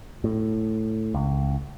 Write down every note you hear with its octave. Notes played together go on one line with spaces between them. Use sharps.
A2
C#2